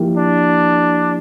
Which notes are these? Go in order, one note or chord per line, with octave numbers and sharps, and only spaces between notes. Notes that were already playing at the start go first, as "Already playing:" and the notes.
Already playing: F3 A#3 E4 G4
D4